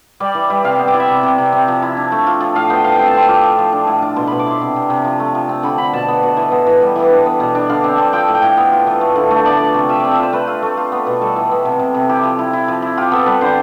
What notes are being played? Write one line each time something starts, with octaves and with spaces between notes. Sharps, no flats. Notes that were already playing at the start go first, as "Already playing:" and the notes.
G3 D5
E3
G3
C3 F5
B3 E5
D5
E4
E5
C3
C3
C3
C4
F3
E4
D4
A3
F4
F3
A2 F5
B3 G5
F3 F5
C4 G5
A5
C4 C6
F4 D6
F3
F3
D4
A2
D4
B2 C6
B2 B5
D6
E4 C6
C3
C3
C3
F3
A3
F3
C4
D3 B5
D3 B5
B2 A5
B3
B2
E3
B3
E3
G3
E3
D4
B3
B2
D4
D3 F5
C4
C4
F3 G5
A2
G5
A2
B3
F4
E3
A3
D3
A3
B3 D5
F3
C3
F4 E5
C4 D5
E5
F4 C5
A3 B4
F4
A3
F4
B3
B2
G3 A4
E3
B3
C3
C3
C3
E4 G4
F3
E4
E4
F3
E4
F4 G4
B3 A4
G3 B4
D3 C5